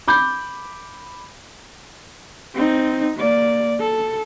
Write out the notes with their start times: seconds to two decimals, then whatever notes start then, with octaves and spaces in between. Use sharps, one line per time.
0.08 B5 D6 G6
2.55 C4 D#4
3.17 A#3 D5
3.80 A4